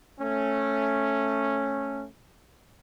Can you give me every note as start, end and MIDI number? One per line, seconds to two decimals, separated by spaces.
0.20 2.06 57
0.20 2.06 61